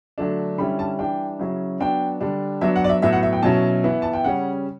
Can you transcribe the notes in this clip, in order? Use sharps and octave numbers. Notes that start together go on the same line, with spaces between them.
D3 F#3 A3 D4
D3 G3 C#4 E4 B5
A5
E3 G3 D4 G5
C#3 F#3 C#4 E4
F#3 B3 D4 G5
D3 G3 D4
F#3 B3 D4 E5
F#5
D5
E5
A2 F#3 B3 E5
F#5
E5
G5
B2 F#3 C#4 E4 A5
E3 B3 E4
A5
G5
C#3 G3 C#4 F#5